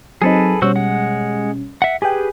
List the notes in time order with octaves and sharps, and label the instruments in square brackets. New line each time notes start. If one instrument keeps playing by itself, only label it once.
[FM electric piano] F#3 C4 D#4 [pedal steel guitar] G#4 A4 B4
[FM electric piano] B2 G3 C#4 [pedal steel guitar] F#4 C5 E6
[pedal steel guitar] G#3 F#5
E5 F#5
[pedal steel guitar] G4 G#4 B4 [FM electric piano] G5 G#5